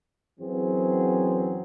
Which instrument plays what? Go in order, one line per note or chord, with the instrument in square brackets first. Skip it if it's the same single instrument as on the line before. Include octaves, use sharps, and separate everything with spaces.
[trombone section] F#2 E3 F#3 C4 G#4